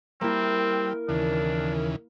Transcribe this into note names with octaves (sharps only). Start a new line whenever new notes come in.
G3 A#3 C4 E4 A#4
D#2 C#3 E3 D4